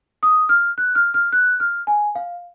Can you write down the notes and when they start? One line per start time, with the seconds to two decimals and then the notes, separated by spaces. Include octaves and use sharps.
0.23 D#6
0.49 F6
0.78 F#6
0.95 F6
1.14 F6
1.32 F#6
1.60 F6
1.87 G#5
2.15 F5